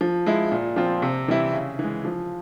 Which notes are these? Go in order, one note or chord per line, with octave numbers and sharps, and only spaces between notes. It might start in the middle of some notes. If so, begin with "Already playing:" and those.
F3
G#3 E4
A#2
F3 C4 F4
C3
E3 G3 C4 E4
C#3
E3 G#3
F3